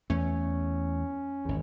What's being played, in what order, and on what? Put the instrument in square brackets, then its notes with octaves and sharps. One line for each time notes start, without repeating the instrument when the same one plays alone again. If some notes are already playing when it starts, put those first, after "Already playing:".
[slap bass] E2 A3 [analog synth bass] C#4
[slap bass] G#1 E2